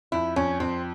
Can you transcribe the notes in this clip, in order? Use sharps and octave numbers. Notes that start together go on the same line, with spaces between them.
F2 E4
F2 C#4
F2 C4